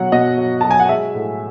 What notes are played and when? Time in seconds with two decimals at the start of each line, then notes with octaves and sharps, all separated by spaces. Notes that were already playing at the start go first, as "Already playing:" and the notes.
Already playing: B2 F#3 F#5
0.12 B2 D#5
0.38 F#3
0.61 F#3 A5
0.71 G#5
0.80 F#5
0.89 G#3 E5
1.15 A2